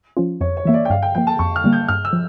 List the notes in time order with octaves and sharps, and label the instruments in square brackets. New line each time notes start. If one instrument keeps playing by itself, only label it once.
[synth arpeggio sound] F3 C#4 F4
[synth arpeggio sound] F2 [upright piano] C#5
[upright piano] C#5
[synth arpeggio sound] E3 A#3 [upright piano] E5
[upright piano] D5
G5
[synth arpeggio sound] G2 [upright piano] F5
[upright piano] G5
[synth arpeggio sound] F3 A#3 [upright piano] G5
[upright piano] A5
[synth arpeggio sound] F2 [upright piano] C#6
[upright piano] F6
[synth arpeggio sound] D3 G3 A#3
[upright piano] G6
[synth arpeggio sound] G2 [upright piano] F6
[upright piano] E6
[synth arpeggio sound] F3